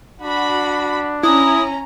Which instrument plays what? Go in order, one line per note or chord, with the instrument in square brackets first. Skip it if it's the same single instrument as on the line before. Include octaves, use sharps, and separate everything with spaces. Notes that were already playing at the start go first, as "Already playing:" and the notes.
[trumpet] D4 [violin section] F#4 B5
[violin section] C#4 A#5 [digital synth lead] E4 [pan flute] D#6